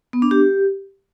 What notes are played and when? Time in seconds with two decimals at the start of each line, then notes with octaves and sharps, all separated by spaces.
0.13 B3
0.22 D4
0.31 G4